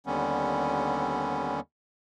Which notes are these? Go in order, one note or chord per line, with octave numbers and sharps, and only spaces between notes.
D#2 D3 G3 B3 C#4